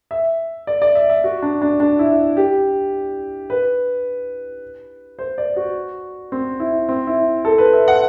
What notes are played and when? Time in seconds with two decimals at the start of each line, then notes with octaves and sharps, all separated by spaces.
0.11 E5
0.67 D5
0.82 D5
0.95 E5
1.09 E5
1.24 F#4
1.43 D4
1.62 D4
1.80 D4
1.99 E4
2.37 G4
3.50 B4
5.19 C5
5.38 D5
5.56 F#4
6.32 C4
6.60 E4
6.89 C4
7.07 E4
7.45 A4
7.58 B4
7.73 E5
7.88 F#5